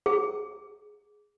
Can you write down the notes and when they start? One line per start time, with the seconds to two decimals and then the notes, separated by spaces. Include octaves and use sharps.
0.06 G#4